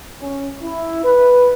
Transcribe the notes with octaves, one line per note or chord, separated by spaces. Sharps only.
C#4
E4
B4